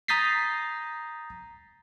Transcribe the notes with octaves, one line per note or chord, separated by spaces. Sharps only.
A#5 D#6 G6 A6 B6 C7